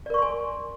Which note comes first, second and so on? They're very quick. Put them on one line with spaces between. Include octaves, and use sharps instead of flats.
D5 A#4 C#6 C6 G#5